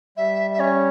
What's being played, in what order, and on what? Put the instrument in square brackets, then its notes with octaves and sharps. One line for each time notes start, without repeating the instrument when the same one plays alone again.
[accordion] G3 [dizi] E5
[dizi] E5
[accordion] C#4 [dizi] C#5